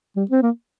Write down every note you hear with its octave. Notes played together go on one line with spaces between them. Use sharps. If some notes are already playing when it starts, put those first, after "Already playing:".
G3
C4
A#3